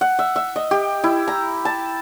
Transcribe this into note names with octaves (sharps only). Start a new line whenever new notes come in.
F#5
E5
E5
D#5
G4
E4
A#5
A5